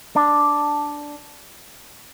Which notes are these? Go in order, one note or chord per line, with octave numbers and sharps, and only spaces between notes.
D4